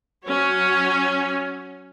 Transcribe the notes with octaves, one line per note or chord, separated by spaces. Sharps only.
F#3 C#4 C#5